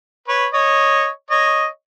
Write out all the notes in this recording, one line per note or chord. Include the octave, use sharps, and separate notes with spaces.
B4 C#5
C#5 D#5
C#5 D#5